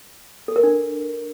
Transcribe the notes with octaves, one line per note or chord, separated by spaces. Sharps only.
A4
A#4
D4